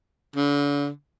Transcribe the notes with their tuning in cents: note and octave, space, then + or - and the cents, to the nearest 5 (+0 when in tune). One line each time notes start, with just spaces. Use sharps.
D3 -40